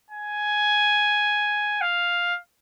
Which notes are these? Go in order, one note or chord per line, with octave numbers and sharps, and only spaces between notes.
G#5
F5